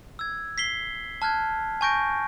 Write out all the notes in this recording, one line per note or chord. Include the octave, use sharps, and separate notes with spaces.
E6 G#6
B6 C7 G7
A5 F6 F#6 G#6
G#5 A5 C#6 G6 A#6 D7